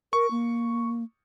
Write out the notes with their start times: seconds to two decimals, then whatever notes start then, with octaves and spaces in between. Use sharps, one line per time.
0.13 A#4 C#6
0.31 A#3